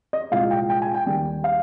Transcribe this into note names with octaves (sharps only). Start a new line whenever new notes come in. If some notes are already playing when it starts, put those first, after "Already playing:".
D#5
C2 A#2 F3 G#3 F5
G5
G5
G#5
G5
D#2 D#3 G3
F5